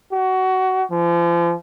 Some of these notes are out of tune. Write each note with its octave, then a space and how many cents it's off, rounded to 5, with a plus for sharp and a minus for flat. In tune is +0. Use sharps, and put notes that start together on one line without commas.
F#4 +20
F3 -35